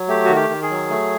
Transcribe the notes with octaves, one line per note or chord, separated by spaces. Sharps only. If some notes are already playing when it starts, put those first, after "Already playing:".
Already playing: F#3
A3 G4
D#3 F#4
G4
D#3
G#4
F#3
A3